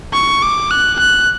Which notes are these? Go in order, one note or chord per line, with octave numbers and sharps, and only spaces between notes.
C#6
D6
F#6
F#6